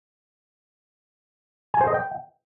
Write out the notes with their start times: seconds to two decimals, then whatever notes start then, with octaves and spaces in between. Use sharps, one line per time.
1.74 G#5
1.81 C5
1.87 D#5
1.94 G5